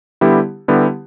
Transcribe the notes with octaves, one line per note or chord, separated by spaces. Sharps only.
D3 G3 B3 E4 G4
D3 G3 B3 E4 G4